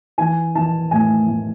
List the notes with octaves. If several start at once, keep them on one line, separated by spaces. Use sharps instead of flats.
E3 G#5
E3 A5
A2 G#5
A2